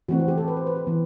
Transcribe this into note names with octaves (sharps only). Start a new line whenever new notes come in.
E3 A3 C4 F#4
F#4
G4
A4
B4
C5
B4
G4
E3 B3